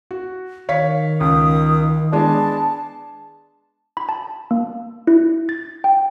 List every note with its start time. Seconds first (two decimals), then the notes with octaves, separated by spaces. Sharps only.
0.11 F#4
0.69 D#3 C#5 F5 B6
1.20 C#2 D#6
2.13 G#3 B3 D4 A5
3.97 B5
4.09 A5
4.51 A#3
5.07 E4
5.49 A6
5.84 G5